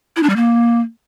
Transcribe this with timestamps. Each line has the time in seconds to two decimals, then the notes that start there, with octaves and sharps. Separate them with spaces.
0.16 E4
0.23 D4
0.30 G3
0.36 A#3